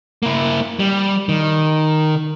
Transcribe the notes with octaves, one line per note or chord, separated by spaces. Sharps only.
A#3 E4
G3
D#3